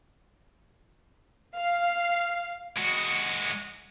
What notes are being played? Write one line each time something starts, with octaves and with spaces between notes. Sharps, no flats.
F5
G#3 F#4